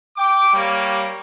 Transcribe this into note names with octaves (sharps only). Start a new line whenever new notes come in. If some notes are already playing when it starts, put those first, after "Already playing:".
G5 D6
G3 A#3 C#5